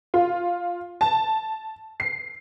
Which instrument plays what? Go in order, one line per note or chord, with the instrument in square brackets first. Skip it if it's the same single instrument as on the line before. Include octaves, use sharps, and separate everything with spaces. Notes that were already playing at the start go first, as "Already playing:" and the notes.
[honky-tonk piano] F4
A5
C7